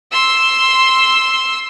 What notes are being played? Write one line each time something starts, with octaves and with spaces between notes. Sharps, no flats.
C6 E6